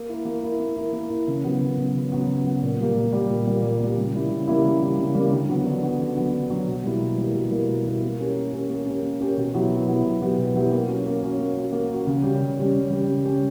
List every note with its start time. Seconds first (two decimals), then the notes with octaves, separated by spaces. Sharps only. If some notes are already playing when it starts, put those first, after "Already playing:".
Already playing: A#3
0.09 E4 A#4
0.25 A#3
0.43 E4 A#4
0.60 A#3
0.77 E4 A#4
0.93 A#3
1.10 E4 A#4
1.28 C#3
1.44 F#3 B3
1.61 C#3
1.78 F#3 B3
1.95 C#3
2.12 F#3 B3
2.28 C#3
2.45 F#3 B3
2.63 A#2
2.79 G3 A#3
2.96 A#2
3.13 G3 A#3
3.30 A#2
3.47 G3 A#3
3.63 A#2
3.80 G3 A#3
3.96 C#3
4.14 G3 A#3 E4
4.30 C#3
4.48 G3 A#3 E4
4.64 C#3
4.81 G3 A#3 E4
4.99 C#3
5.15 G3 A#3 E4
5.32 D3
5.49 F#3 B3 F#4
5.66 D3
5.83 F#3 B3 F#4
6.00 D3
6.16 F#3 B3 F#4
6.34 D3
6.50 F#3 B3 F#4
6.67 B2
6.84 G3 A#3 E4 A#4
7.00 B2
7.17 G3 A#3 E4 A#4
7.34 B2
7.51 G3 A#3 E4 A#4
7.67 B2
7.85 G3 A#3 E4 A#4
8.02 A#3
8.18 C#4 G4 A#4
8.35 A#3
8.53 C#4 G4 A#4
8.69 A#3
8.86 C#4 G4 A#4
9.03 A#3
9.21 C#4 G4 A#4
9.37 B2
9.54 F#3 B3 E4 G4
9.70 B2
9.88 F#3 B3 E4 G4
10.04 B2
10.21 F#3 B3 E4 G4
10.38 B2
10.55 F#3 B3 E4 G4
10.71 A#3
10.89 C#4 F#4
11.06 A#3
11.23 C#4 F#4
11.39 A#3
11.57 C#4 F#4
11.72 A#3
11.90 C#4 F#4
12.07 C#3
12.23 G3 C#4 G4
12.41 C#3
12.57 G3 C#4 G4
12.74 C#3
12.90 G3 C#4 G4
13.08 C#3
13.25 G3 C#4 G4